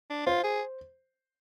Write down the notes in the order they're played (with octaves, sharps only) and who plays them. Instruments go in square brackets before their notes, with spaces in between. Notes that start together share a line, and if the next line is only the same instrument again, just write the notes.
[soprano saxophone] D4
[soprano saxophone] F4 [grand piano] C5
[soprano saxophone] G#4